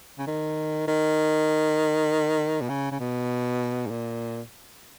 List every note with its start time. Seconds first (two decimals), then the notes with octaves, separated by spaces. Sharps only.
0.18 C#3
0.27 D#3
0.88 D#3
2.61 B2
2.69 C#3
2.91 C#3
3.00 B2
3.86 G#2
3.91 A#2